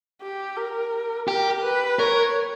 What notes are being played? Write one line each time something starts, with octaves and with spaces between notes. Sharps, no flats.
G4
A#4
G4 A#4
B4
A#4 C#5